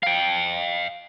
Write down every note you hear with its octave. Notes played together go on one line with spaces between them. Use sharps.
F5 G5